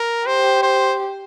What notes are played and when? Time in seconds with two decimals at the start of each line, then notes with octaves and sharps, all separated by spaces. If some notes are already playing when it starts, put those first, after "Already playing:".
Already playing: A#4
0.26 G4 C5
0.63 C5